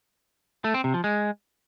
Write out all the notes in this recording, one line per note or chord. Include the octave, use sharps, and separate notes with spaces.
A3
C4
C3
F3
G#3